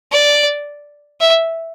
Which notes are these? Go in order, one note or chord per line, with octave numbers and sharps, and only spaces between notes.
D5
E5